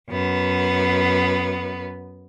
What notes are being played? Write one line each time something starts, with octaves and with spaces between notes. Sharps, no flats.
F#2 B3